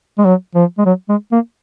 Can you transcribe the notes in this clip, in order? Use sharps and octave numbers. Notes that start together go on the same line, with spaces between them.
G#3
F#3
F3
G#3
F#3
G#3
A#3